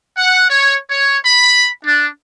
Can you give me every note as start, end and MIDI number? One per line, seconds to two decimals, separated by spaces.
0.17 0.46 78
0.49 0.76 73
0.90 1.18 73
1.25 1.69 83
1.85 2.07 62